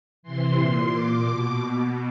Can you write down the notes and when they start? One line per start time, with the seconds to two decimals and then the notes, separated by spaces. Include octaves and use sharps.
0.23 C3 E3 C6
0.56 A#2
0.90 A#2 D6
1.24 B2
1.58 B2